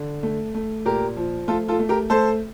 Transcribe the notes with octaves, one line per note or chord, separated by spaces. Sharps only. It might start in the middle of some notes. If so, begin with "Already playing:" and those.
Already playing: D3
A3
A3
A#2 G4 A#4
F3
A3 F4 A4
F4 A4
A3
G4 A#4
A3 A4 C5